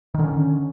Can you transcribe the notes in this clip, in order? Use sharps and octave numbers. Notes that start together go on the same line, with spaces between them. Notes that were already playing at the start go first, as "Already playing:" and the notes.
D3 D#3 C#4